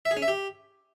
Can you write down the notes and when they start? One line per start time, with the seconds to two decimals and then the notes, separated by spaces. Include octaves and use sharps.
0.05 E5
0.11 G#4
0.17 C#4
0.22 E5
0.28 G4